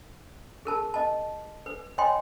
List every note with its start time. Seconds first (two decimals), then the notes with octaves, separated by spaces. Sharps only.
0.65 G#4 A#4 A5
0.94 D#5 A5
1.66 B4
1.98 C#5 D#5 G5 G#5 C6